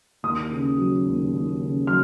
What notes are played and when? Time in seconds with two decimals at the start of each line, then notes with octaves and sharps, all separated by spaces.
0.23 D#2 D#6
0.51 C#3
0.78 F#3
1.05 D#2
1.33 D#2
1.60 C#3
1.87 F#3 F6